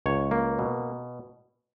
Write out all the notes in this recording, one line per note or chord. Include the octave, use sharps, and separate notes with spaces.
C#2 C#5
A#3
B2